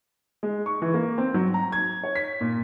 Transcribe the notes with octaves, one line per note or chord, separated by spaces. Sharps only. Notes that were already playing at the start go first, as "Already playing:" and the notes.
G#3
C#6
E3
A#3
C4
F#3
A#5
G#6
C#5
B6
A#2